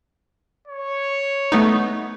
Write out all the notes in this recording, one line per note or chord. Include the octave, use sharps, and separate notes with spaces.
C#5
A3 B3 D#4